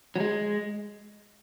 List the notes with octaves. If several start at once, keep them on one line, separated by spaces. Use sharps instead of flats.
F#3
G#3